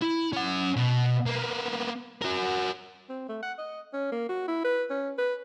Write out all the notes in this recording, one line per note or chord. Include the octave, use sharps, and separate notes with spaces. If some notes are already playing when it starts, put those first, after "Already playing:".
E4
C#4 F#5
B2
A#3 B3
F#4 A#4
C4
A3
F#5
D#5
C#4
A#3
F#4
E4
B4
C#4
B4